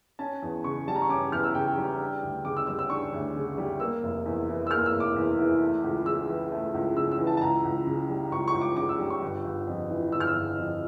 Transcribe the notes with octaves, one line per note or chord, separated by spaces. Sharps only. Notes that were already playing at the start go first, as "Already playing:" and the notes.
C#4 A5
E2
C#3 C#6
G3 A5
A#5
C#6
C#4 D6
E2 F6
E6
C#3 G5
G3
D4
D2
C#3 D6
E6
G3 E6
E6
D4 C#6
D2
C#3
G3
A#3 E6
F1
E2
E3
E6
A#3 F6
E6
F1
D6
E2
E3
A3
C#2
C#3 E6
E3
A3
C#2
C#3 E6
E6
E3
A5
A5
C#2 A#5
C#2
C#3
G3
C#2 C#6
C#6
C#2
D6
C#3 D6
E6
G3
C#6
G1
G1
F2
E3
G1 E6
F6
E6
G1
F2